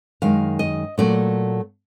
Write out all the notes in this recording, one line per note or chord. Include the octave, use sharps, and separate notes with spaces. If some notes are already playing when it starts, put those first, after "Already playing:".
F#2 D#3 G#3 F5
D#5
A#2 F#3 A3 D5